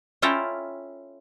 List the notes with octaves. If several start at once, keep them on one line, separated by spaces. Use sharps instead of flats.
C#4 E4 F4 A4 G5 A#5